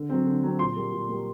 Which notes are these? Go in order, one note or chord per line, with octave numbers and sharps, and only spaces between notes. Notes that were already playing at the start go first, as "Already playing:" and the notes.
Already playing: D3
F#3 C4
D3
F#3 C4
A#2 C6
G3 A#3
A#2
G3 A#3